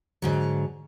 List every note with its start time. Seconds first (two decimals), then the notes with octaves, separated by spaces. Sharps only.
0.22 G#2 D3 F#3